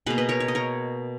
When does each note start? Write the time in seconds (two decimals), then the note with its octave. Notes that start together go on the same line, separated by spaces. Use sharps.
0.06 B2 A#3 G#4 B4
0.18 B4 D#5
0.29 A#4 C#5
0.40 C#5
0.48 D#5
0.55 A#4 C#5